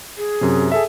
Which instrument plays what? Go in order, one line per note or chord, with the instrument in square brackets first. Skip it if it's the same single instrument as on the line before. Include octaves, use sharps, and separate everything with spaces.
[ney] G#4
[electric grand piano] F#2 C3
G#4 A4 E5